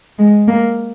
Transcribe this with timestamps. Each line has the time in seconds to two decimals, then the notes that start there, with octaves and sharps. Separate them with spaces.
0.18 G#3
0.47 A#3